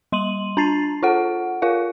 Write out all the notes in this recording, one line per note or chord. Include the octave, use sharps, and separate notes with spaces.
G3 C6 D#7 F#7
D4 A5 A#5 A6 C7
F4 A4 F#5
F4 A#4 F5